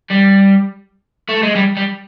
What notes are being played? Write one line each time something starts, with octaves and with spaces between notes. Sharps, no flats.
G3
A3
G#3
G3
G3